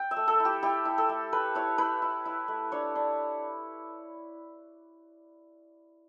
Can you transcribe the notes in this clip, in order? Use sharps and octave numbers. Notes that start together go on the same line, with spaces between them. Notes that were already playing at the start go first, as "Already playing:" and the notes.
Already playing: G5
E5
A3
A4
E4
G4
E4 G4
E4
A4
A3
A3 B4
E4 C#5
E4 B4
E4
E4
A3
D4 C#5
D4